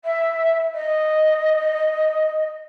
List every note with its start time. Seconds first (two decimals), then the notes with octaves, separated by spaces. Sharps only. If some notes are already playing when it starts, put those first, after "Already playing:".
0.04 E5
0.74 D#5